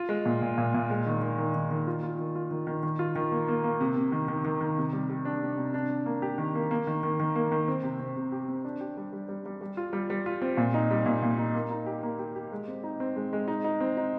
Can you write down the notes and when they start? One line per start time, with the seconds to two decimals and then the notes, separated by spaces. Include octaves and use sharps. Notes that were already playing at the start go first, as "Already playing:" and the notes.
Already playing: F4
0.09 G#3
0.25 A#2
0.42 A#2
0.58 A#2
0.74 A#2
0.90 G#3
1.06 D#3
1.22 D#3
1.38 D#3
1.54 D#3
1.71 D#3
1.87 F4
2.03 F4
2.19 D#3
2.36 F4
2.51 D#3
2.67 D#3
2.83 D#3
2.99 F4
3.16 D#3
3.32 A#3
3.48 A#3
3.64 A#3
3.81 C3
3.96 C3
4.12 D#3
4.28 D#3
4.45 D#3
4.61 D#3
4.78 C3
4.93 G3
5.09 G3
5.25 D4
5.42 C3
5.57 C3
5.74 D4
5.90 D4
6.06 A#3
6.22 G4
6.38 D#3
6.55 A#3
6.71 A#3
6.87 D#3
7.03 D#3
7.20 D#3
7.35 A#3
7.52 D#3
7.68 C4
7.83 C3
8.00 C4
8.16 C3
8.32 G4
8.48 C4
8.65 D4
8.80 G4
8.97 G3
9.13 G3
9.28 G3
9.46 G3
9.61 G3
9.77 F4
9.93 G3
10.10 G3
10.26 F4
10.42 C4
10.57 A#2
10.74 D#4
10.91 G3
11.06 A#2
11.22 A#2
11.38 D#4
11.55 A#3
11.71 D#4
11.86 G4
12.03 A#3
12.19 G4
12.36 G4
12.52 G#3
12.68 C4
12.84 D#4
13.00 C4
13.16 G#3
13.33 G#3
13.48 D#4
13.64 D#4
13.80 C4
13.97 D#4